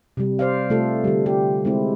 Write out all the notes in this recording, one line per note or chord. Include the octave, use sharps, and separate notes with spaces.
C3 G3
C5 D5 F5
C3 A3 F4 A4
D3 G3
G4
G#3 C4 E4